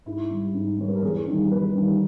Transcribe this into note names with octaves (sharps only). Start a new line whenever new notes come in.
G#2 E4
G3
G#2
G3 C#5
B4
A#4
E2 G#4
D#3 G3
E2 B4
D#3 G3